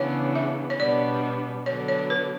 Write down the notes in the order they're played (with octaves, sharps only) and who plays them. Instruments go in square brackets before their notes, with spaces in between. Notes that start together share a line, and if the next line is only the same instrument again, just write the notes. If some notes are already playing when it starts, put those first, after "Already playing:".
Already playing: [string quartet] C#3 E3 B3 D4 [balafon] C#5
[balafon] E5
C#5
[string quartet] B2 G3 B3 D4 [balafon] D5
[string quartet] D3 F#3 B3 D4 [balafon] C#5
[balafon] C#5
B4